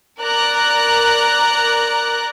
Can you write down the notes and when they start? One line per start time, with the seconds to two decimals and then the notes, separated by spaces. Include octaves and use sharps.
0.21 A#4 D5 A#5 F#6